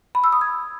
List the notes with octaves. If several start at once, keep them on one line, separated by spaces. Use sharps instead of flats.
B5
E6
D#6
G#6